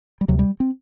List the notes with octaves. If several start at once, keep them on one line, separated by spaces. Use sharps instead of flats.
G3
D2 C3 F#3
G3
C4